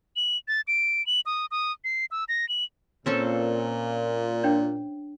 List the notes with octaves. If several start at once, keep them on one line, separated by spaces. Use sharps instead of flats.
F#7
A6
D7
F#7
D#6
D#6
C7
E6
A#6
F#7
A#2 C4 C#4 A4
D4 C#5 G5